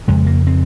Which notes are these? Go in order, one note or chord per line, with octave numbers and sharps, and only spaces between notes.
F2 C#3 G#3
A#3
C4